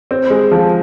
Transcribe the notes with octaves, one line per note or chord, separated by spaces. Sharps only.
C4
G#3
F3